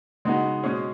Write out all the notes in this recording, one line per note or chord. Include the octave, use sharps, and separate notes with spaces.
C#3 G#3 B3 D#4 F#4
B2 G#3 C#4 G#4